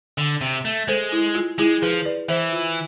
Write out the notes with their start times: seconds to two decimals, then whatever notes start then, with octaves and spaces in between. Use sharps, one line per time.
0.18 D3
0.41 C3
0.65 A3
0.88 G#3 A4 C5
1.12 E4
1.35 F4
1.58 G#3 E4 G#4
1.82 F3 G#4 B4
2.05 B4 D5
2.29 E3 C5 E5
2.52 F4